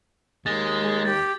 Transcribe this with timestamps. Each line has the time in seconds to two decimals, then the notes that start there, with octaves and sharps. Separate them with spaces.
0.46 D#2 G#3 A6
0.82 G#4
1.05 G4 A6